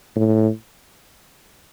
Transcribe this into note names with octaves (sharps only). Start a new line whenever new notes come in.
A2